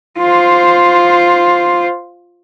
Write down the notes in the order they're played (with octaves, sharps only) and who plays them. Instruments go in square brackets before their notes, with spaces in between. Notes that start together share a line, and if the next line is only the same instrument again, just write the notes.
[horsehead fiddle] F4 C5